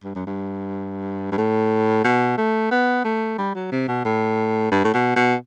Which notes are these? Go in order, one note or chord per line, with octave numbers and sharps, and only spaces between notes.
G2
F#2
G2
G2
A2
B2
A3
B3
A3
G3
F#3
C3
B2
A2
G2
A2
B2
B2